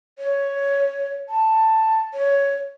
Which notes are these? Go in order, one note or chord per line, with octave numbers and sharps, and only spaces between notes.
C#5
A5
C#5